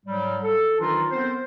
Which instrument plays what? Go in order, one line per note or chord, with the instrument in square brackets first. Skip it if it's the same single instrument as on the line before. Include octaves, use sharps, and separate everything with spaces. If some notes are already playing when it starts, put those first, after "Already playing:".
[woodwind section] G#2 F#3 G3
A4
D#3 E3 F#3 D4 D#4 F4
B3 C4 A4 A#4 C5